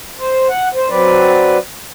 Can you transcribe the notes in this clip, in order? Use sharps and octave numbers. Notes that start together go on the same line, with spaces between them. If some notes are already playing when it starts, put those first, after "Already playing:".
C5
F#5
C5
F#3 C4 B4 D5